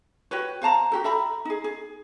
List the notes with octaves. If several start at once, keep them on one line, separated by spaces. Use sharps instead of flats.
F#4 G4 B4 C#5
C5 F5 A5 A#5
F#4 G4 A4
A4 E5 A#5 B5
D#4 G#4
G#4